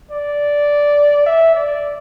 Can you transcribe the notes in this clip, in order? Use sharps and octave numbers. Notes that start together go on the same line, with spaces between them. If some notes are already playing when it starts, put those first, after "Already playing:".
D5
E5
D5